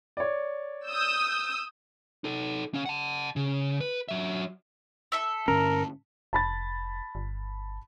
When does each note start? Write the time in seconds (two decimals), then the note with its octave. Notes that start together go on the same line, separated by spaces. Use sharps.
0.17 C#5 D5
0.86 D#6 E6 G6
2.24 D#4 A4
2.74 C#4 F5
2.86 F#5 A5
3.36 C#3
3.81 B4
4.09 F#3 E5
5.12 A4 E5 E6
5.48 G2 D3 C#4 A#4
6.33 F1 A5 B5 A6
7.15 G1